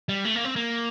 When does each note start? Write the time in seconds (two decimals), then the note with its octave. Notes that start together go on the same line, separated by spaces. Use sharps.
0.09 G3
0.25 A3
0.35 A#3
0.45 C4
0.56 A#3